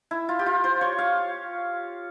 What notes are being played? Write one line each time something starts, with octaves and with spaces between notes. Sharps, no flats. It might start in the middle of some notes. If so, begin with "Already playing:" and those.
E4
F4
G4
F4
C5
C#5
F5